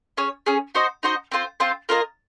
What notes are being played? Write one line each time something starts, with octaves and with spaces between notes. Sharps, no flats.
C#4 G#4 C#5
C#4 G#4 C#5
D#4 F#4 C5 D#5
D#4 F#4 C5 D#5
C4 F4 C5
C4 F4 C5
A#3 F4 A#4 D#5